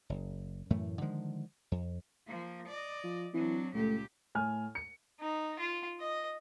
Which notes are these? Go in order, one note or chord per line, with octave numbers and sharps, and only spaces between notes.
F#1
F#2 A2 E3 A3
D3 D#3 F3 G#3
F2
F3 A#3
D5 D#5
F3
E3 F#3 C4 D4
C#2 A#2 A3 G4
A2 G#5 F6
C#7
D#4
F4
D#5